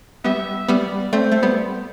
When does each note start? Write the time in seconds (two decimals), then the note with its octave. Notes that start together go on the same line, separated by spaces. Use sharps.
0.24 G3 B3 E5
0.68 G3 B3 D5
1.13 A3 C4 C5
1.32 A3
1.43 G3 B3